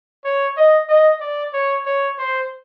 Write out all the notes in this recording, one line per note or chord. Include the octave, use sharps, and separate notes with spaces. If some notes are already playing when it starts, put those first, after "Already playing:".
C#5
D#5
D#5
D5
C#5
C#5
C5